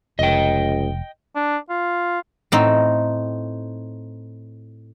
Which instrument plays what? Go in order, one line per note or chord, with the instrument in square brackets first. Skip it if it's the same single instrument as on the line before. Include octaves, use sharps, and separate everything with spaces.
[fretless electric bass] F1 [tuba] C#2 [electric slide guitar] D#5 G5
[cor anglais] D4
F4
[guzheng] A2 C4 D#4